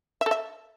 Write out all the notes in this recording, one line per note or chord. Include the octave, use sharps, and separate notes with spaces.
E5
A4
E5